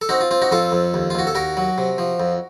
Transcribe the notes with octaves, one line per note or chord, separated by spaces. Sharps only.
A4
C4 D#4 F#4
F4
C4 F4
D#4 F#4
F2 F4 A4
F2
D#2
F4
D#2 F#4
A4
D#2 F#4 A#4
F#3
C3
F3
F2